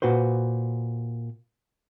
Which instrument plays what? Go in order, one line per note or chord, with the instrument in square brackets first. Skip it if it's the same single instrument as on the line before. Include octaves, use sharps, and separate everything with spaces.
[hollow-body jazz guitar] A#2 F#4 B4 C5